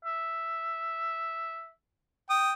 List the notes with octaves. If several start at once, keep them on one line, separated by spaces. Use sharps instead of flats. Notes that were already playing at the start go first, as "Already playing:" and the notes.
E5
G5 D#6